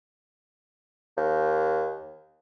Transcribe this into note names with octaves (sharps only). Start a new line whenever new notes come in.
D#2